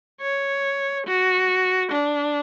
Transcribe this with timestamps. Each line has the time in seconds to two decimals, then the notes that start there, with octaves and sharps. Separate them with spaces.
0.21 C#5
1.06 F#4
1.91 D4